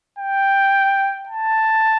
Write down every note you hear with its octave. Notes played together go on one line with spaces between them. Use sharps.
G5
A5